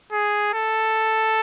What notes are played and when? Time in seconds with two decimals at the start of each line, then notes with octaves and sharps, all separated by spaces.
0.12 G#4
0.53 A4